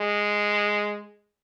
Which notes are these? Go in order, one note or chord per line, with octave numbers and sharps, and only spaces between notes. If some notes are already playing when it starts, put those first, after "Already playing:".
Already playing: G#3